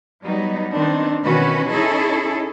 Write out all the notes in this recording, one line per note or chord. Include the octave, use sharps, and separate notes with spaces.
F#3 G3 B3 D#4
D#3 B3 C4 D4 D#4
B2 D#3 E3 C#4 F#4 B4
C#4 D#4 E4 G#4 A4